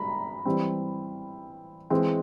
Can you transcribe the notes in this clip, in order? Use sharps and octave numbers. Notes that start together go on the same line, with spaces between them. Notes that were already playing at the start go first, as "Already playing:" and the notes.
Already playing: A#5 B5
E3 G3 C4
E3 G#3 C4